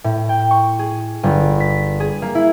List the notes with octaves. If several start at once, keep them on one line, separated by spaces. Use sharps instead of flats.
A2
G5
C#6
G#4
G1
B6
G#4
A#3
E4